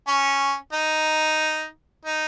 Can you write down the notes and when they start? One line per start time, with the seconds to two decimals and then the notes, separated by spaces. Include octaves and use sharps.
0.08 C#4
0.73 D#4
2.05 D#4